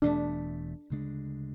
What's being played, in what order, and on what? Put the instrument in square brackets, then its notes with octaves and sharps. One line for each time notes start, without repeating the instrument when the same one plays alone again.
[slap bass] E1 E2 B2 A3 [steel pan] D4
[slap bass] D2 C#3 G#3 D4